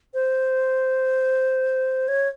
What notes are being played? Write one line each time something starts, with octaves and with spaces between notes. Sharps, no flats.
C5
C#5